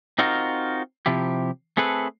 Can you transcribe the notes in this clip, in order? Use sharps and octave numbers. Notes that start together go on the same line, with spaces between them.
C4 D#4 F4 F#4 A#4
C3 F3 E4 G4
A3 C4 G#4 A4 B4